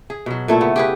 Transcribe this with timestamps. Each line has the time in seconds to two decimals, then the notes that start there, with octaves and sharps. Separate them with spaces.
0.10 G#4
0.26 B2 F#3
0.48 A#2 A3 E4
0.61 C#3 B3
0.76 G4 G#4 B4